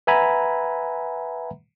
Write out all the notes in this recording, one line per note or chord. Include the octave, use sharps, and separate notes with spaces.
B4 E5 F#5 G#5 A#5 B5